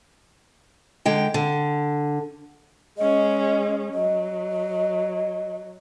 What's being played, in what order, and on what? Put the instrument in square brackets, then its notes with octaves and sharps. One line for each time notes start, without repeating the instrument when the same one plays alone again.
[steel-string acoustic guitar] D3 G#3 G5
D3
[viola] G#3 C#4 [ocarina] D#5
[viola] F#3 [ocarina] D#5